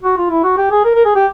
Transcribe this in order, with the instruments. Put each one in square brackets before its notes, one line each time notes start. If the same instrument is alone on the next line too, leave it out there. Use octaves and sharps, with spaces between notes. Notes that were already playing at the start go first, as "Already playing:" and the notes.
[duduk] F#4
F4
E4
F#4
G4
G#4
A#4
A#4
G#4
G4